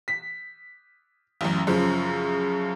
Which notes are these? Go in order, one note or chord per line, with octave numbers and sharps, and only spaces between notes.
B6
A1 F#2
F#2 C#3 F3